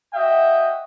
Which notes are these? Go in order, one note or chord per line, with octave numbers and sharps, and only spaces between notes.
F#4 D#5 E5 G5